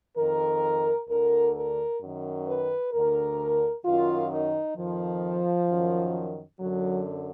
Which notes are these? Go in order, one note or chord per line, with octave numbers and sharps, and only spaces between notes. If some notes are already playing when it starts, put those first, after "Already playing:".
F2 D#3 A#4
D2 D3 A#4
A#4
F#2 D#3
B4
D2 D3 A#4
F#2 D#3 F4
D#4
F2 D#3 F3
F#2 D#3
F#2 D3 F#3